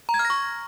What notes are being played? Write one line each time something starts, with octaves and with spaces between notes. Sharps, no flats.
A#5
G#6
F6
A#6
C#6